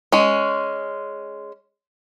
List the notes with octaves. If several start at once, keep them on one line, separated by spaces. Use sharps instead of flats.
G#3 C#4